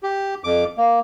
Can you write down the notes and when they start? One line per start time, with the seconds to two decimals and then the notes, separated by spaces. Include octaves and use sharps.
0.03 G4
0.44 F2 D6
0.78 A#3